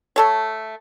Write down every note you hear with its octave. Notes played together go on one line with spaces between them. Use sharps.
A3 A4 C#5